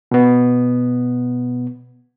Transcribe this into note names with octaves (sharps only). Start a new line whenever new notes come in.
B2 B3